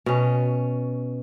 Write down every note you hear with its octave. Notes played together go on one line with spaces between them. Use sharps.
B2 C#4